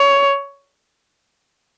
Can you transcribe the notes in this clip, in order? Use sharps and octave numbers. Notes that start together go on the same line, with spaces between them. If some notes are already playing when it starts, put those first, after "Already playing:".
Already playing: C#5